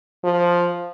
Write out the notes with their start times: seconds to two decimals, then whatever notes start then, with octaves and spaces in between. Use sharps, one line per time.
0.24 F3